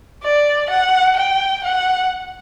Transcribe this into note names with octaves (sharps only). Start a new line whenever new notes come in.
D5
F#5
G5
F#5